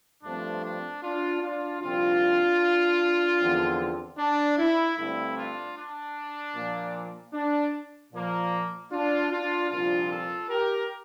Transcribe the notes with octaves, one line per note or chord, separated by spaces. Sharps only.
G2 F3 A3 C4 D4
D4
D4 F4
D4 F4
C2 A#2 F3 C4 D4 F4
E2 D3 F3 C4
D4
E4
G2 D3 A3 C4 E4
D4 F4
D4
A#2 F3 A#3
D4
A#2 F3 A#3
D4 F4
D4 F4
C2 A#2 F3 C4 D4 F4
F4 A4
G4 A#4